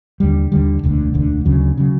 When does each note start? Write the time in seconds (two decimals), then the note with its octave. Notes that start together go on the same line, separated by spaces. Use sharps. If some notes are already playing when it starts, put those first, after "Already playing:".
0.20 D#2 D3 G3
0.52 D#2 D3 G3
0.83 E1 D2 D3
1.14 E1 D2 D3
1.45 D2 C#3 F#3
1.77 C#3 F#3